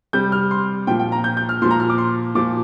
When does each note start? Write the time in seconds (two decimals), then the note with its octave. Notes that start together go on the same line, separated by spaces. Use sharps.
0.13 C3 G3 G6
0.32 F6
0.51 C6
0.87 A#2 F3 G5
0.99 G5
1.12 A#5
1.24 G6
1.37 G6
1.49 F6
1.62 A#2 F3 C6
1.71 A#5
1.80 F6
1.90 D6
1.98 C6
2.35 A#2 F3 D6